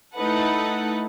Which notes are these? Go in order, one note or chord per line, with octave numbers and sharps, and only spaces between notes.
A3 D#4 E4 A4 B4 F#5